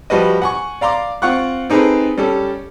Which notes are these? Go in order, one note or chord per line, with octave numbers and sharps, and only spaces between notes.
F3 G3 F#4 B4 D#5
F#5 G#5 C#6
D5 F5 A#5 C6 D6
C4 F4 F#5 C#6 F#6
C4 D#4 G#4 A4 B4
G3 C#4 A4